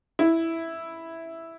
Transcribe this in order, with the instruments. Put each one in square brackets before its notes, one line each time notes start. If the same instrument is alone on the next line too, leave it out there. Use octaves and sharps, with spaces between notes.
[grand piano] E4